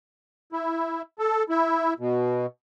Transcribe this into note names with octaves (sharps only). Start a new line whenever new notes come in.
E4
A4
E4
B2